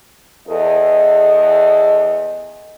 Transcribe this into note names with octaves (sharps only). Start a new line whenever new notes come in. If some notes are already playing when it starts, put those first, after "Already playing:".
E2 A4 D#5